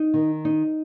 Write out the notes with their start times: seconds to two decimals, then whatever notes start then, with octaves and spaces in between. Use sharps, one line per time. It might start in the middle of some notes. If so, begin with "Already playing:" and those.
Already playing: D#4
0.14 D#3
0.45 D#4